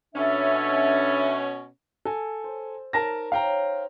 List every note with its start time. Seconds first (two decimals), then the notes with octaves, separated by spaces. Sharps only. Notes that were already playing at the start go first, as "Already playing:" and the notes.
0.15 B2 C#4 D4 A4 E5
2.05 A4 G#5
2.44 C5
2.93 D#4 A#4 D#5 A5 A#5 A#6
3.32 C5 C#5 F5 G5 A#5